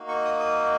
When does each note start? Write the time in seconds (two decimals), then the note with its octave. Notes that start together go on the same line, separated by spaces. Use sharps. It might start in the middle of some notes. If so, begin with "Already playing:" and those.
Already playing: A#3 D#4 F#4
0.08 C#6
0.25 D#6
0.40 D#6